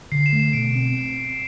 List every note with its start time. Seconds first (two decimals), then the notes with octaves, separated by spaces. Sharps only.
0.12 D3 C7
0.26 E7
0.32 A3
0.40 E7
0.53 B2 D7
0.75 C4